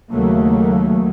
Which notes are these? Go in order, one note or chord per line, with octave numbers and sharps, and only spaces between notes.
D#2 C#3 F#3 A3 A#3